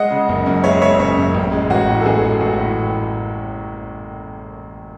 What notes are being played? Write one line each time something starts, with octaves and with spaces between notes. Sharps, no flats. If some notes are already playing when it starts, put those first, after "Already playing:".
Already playing: G#3 D#5 F#5
C#3
F#1
F#2
G#3 C#5 E5
C#3 C#5 E5
F#1 C#5 E5
F#2
A1
G#3
A1 F#4
A2
A4
A1 G#4
G#3
A1 F#4
A2